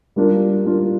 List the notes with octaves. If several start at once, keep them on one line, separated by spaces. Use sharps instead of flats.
G3 A#3 D4 F4 A#4
G3 A#3 D4 F4 A#4